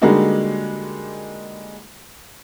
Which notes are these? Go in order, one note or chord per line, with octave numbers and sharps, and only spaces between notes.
D3 G3 G#3 A#3 D#4 F#4